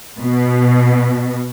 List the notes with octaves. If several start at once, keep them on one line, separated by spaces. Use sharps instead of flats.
B2